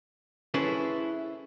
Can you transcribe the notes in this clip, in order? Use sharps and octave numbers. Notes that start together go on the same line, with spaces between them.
C#4 E4 G#4 A4 B4 C5